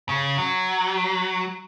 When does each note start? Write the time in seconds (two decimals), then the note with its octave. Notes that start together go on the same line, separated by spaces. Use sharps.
0.09 C#3
0.38 F#3